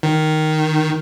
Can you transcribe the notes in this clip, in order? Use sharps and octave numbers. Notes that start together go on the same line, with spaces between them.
D#3